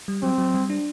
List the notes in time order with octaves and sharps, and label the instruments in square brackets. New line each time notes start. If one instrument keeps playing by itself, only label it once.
[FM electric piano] G3
[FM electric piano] F#3 [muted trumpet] C4
[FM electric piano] F#3
G3
D4